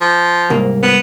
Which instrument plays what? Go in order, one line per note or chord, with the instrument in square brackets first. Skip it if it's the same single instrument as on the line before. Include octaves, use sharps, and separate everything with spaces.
[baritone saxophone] F3
[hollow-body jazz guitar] C2 G#2 A#3
[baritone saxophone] B3